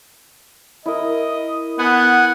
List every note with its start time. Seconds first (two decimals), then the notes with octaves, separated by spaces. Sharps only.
0.86 E4 A#4 D#5
1.79 B3 F#5 G#5